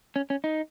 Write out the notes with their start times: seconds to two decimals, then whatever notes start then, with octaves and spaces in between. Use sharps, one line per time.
0.16 C#4
0.30 C#4
0.44 D#4